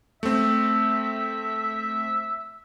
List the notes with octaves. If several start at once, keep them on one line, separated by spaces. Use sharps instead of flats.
A3 C4 E5